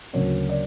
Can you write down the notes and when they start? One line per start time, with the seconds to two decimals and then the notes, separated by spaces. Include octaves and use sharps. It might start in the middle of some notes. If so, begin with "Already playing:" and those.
0.13 D2 C#3 F#3 A#3 C#5
0.49 D5